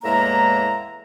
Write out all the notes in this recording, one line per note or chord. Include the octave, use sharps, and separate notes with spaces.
E2 A2 G#3 A#3 E5 A#5